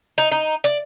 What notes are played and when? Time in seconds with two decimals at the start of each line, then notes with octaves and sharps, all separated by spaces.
0.18 D#4
0.31 D#4
0.64 D5